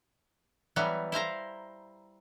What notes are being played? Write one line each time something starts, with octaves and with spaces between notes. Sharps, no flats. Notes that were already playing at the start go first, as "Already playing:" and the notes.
E3 F#3 G3 B3
E4 C5 F5 A#5